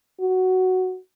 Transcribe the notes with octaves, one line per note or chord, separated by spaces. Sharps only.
F#4